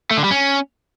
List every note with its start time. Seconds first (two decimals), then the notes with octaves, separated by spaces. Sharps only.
0.11 A3
0.17 D3
0.24 G3
0.31 C#4